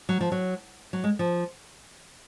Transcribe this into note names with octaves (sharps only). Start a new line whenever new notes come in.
F#3
F3
F#3
F#3
G#3
F3